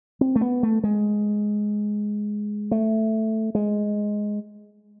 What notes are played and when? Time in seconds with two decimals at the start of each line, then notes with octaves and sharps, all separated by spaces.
0.21 C4
0.36 A3
0.41 B3
0.63 A3
0.84 G#3
2.71 A3
3.55 G#3